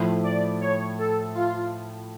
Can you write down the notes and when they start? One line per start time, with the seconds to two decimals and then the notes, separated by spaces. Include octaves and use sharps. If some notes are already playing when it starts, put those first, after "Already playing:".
Already playing: A2 F3 A3 E4
0.24 D5
0.61 C#5
0.99 A4
1.35 F4